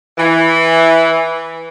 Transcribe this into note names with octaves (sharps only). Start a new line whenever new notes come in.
E3